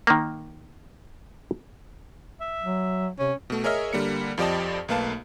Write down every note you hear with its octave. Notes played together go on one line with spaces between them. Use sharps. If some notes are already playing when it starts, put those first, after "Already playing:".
D#3 A#3
E5
F#3
C3 C#4
B2 A3
G#4 A#4 C#5 D#5 E5 F6
D3 G3 A#3 C#7
F2 F3 G4 D5 D#5 A5
B1 A3 A#3 B4 F5 A5